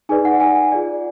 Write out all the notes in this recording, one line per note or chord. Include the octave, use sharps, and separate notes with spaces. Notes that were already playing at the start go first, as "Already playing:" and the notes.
D#4 G#4 B4 D5 G#5
F#5
G#5
F4 G#4 D5